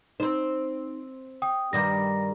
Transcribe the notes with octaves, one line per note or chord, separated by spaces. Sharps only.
C4 D#4 C5
G5 D#6
G2 D#3 G3 A#6